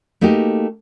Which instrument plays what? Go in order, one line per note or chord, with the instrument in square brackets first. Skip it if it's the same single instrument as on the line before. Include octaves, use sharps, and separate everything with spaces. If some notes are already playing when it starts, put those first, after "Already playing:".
[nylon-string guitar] A3 A#3 D#4 F#4 G4